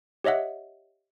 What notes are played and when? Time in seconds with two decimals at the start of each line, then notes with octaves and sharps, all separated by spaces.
0.24 G4 C#5 D#5 E5 F#5